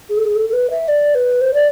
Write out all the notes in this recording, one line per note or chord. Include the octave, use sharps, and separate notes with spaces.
G#4
A4
G#4
A4
A4
B4
E5
D5
B4
C5
D5